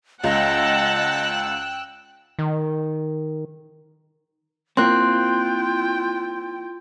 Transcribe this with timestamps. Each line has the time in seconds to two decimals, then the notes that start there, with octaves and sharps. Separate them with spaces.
0.24 C#2 D#5 F#5 G5 A5 E6 F#6
2.39 D#3
4.77 A#3 C4 E4 F4 G5 C6 F#6